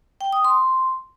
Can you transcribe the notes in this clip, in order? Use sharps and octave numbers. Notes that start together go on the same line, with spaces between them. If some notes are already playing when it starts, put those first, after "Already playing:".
G5
D#6
C6